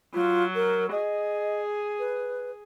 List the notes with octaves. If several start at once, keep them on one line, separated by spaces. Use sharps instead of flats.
F#3 F4
A#4
G#4 D#5
B4